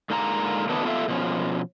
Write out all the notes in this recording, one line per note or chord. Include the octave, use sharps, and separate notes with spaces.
G#2 D3 A#3 F4 A5 A#5
D#3 F#3 A3 B3 D4 D#4
B3 F4 A4 C5 E5 F5
B2 F3 C#4